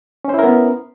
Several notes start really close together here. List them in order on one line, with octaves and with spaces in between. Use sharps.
C#4 C5 E4 A#4 B3